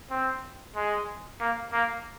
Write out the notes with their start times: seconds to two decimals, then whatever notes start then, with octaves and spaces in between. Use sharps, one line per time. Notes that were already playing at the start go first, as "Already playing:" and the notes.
0.10 C4
0.76 G#3
1.41 A#3
1.73 A#3